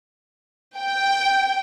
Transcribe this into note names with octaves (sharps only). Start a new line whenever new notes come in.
G5